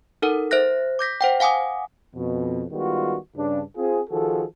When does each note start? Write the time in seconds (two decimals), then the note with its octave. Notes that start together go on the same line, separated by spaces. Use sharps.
0.22 D#4 A4 A#4 F#5
0.51 C5 E5 F#6 A#6
0.99 D6 G6 A#6 B6
1.21 C5 F#5 G5
1.40 F5 F#5 G#5 D6 D#6
2.14 F2 B2
2.71 D#3 G3 G#3 B3 F4 F#4
3.36 G2 C#3 D4
3.76 C4 F4 G#4
4.10 D#3 F3 F#4 G#4 A4